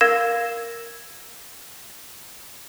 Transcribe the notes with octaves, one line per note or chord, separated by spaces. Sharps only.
A#4 F5 E6 G#6 A#6 E7